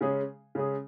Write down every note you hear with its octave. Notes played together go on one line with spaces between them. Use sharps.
C#3 G#3 C#4 G#4
C#3 G#3 C#4 G#4